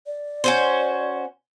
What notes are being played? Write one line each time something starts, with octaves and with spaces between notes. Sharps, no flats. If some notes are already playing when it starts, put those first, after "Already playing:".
D5
C#4 F#4 C5